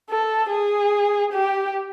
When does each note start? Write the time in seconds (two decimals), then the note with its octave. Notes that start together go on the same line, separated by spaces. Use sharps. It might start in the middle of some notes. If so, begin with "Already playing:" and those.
0.10 A4
0.50 G#4
1.33 G4